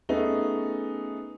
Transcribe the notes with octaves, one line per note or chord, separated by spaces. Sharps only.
A3 B3 C#4 D#4 G#4